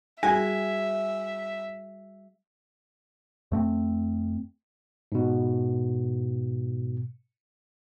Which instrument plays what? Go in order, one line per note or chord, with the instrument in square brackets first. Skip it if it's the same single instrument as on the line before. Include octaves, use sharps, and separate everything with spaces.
[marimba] G3 F#4 G#4 [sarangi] E5 [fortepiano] G#5
[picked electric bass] F2 A3 A#3 C4
[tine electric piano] G#2 B2